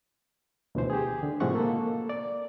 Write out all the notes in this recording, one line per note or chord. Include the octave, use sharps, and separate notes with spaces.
D2 B2 E3 C5
G4 G#4
D3
A2 C3 F3 G#3 F#5 C#6
A#3 A4
D5